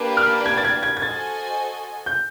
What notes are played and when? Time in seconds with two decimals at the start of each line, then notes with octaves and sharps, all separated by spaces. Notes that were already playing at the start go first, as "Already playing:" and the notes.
Already playing: A#3 D4 G4 B4 D5
0.17 F6
0.46 G#6
0.57 A6
0.65 G#6
0.83 G#6
0.97 G#6
1.02 F#4 A4 C5 D#5 G#5 A6
2.06 G6